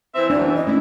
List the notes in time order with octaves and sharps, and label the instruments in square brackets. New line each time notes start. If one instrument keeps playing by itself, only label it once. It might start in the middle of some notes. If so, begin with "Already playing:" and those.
[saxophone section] E3 C4 E5 [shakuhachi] C5
[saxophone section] F#2 E3 C4 [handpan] D4 [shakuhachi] D5
[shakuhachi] D#5
[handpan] A3 C#4 D4 [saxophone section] E4